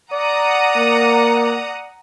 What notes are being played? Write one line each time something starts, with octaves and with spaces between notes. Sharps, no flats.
D5 F#5 A#5 D#6
A#3